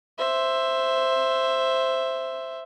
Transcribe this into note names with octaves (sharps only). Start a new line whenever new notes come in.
C5 E5